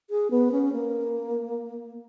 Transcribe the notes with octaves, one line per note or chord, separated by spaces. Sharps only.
G#4
B3
C#4
A#3